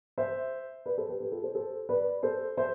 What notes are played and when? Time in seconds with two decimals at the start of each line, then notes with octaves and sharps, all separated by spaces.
0.18 C5 E5
0.86 B4 D5
0.98 A4 C5
1.08 G4 B4
1.20 G4 B4
1.32 F4 A4
1.43 A4 C5
1.55 A4 C5
1.89 B4 D5
2.23 A4 C5
2.57 C5 E5